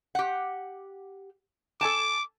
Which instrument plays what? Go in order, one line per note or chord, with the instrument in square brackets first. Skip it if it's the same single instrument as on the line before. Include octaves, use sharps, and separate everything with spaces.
[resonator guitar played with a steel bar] G4 F#5
[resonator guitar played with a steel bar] A4 G#5 A5 [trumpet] D6